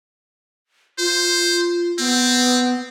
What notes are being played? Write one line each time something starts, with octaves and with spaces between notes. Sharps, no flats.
F4 C5
B3 C4